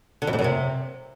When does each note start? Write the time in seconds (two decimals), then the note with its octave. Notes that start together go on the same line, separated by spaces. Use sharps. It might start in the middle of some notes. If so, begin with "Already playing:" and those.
0.22 D3
0.27 F2
0.33 G#2
0.39 F#2
0.44 C3